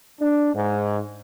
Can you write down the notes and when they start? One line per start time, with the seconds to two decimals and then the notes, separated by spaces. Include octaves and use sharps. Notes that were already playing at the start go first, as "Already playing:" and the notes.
0.21 D4
0.54 G#2